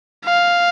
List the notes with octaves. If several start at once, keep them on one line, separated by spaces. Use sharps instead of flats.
F5